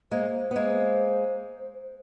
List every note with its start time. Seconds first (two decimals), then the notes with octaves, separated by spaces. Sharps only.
0.11 G#3 A#3 C5
0.51 B3
0.56 G#3 A#3